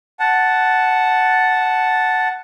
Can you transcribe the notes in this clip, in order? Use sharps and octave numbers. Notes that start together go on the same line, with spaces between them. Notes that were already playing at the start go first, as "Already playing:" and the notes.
F#5 A5